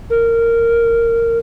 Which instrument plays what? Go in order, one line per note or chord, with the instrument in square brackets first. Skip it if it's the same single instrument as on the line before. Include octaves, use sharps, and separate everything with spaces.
[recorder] A#4